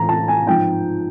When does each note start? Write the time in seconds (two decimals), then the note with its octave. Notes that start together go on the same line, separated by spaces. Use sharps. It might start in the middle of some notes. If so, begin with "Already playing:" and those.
Already playing: A2 E3 A#5
0.09 A5
0.28 G#5
0.46 G#2 F3 G5